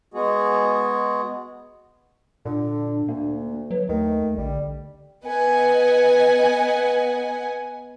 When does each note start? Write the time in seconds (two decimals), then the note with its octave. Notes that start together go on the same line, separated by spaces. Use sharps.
0.14 G#3 B3 F#4 G#4
2.45 A#2 D3 D4
3.08 D2 A#3
3.71 F#3 B4
3.89 D#2 D#3 A3
4.37 A#1 D3 G3
5.25 B3 B4 D#5 F#5 G#5